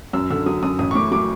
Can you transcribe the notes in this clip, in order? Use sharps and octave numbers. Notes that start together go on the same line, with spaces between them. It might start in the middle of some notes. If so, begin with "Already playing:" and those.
F#2 E6
D3 E6
F#3 D#6
F#2 D#6
A1 D#6
C#6
A2 D6
F#3 D6